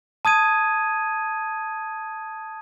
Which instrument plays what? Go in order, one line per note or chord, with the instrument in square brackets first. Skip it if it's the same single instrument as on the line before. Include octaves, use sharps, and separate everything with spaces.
[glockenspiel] A5 D#6 G#6 D#7